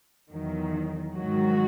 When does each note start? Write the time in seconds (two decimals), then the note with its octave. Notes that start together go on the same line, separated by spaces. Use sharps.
0.30 E2 D#3 F#3
1.15 G#2 D#3 F#3 F#4